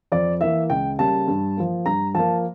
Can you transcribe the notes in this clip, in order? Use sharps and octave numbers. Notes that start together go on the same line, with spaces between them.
F2 D5
E3 A#3 E5
C#2 G5
C#3 G3 A#3 A5
G2
F3 A#3
G2 A#5
F3 A#3 A5